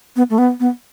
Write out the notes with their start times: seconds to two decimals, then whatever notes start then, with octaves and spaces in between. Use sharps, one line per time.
0.16 B3
0.30 A3
0.38 B3
0.60 B3